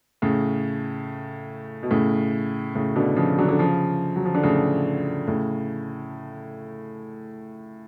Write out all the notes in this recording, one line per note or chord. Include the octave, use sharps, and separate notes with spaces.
A2 C#3
B2
A2 C#3
A2 C#3
B2 D3
C#3 F3
D3 F#3
D3
C#3 F3
F#3
F3
D3
A2 C#3
A2 C#3